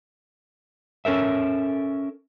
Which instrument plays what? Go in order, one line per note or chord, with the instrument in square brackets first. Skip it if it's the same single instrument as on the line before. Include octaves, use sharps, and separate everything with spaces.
[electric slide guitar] C#4 A4 A#4 E5